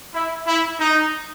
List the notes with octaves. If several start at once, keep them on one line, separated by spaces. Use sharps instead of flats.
E4
E4
D#4